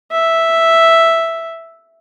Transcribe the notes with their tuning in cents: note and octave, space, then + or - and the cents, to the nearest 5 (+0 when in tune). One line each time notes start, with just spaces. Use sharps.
E5 +0